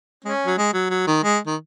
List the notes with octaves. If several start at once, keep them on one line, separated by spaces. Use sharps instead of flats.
G#3 C#4
F#3
G#3
F#3
F#3
D#3
G#3
D#3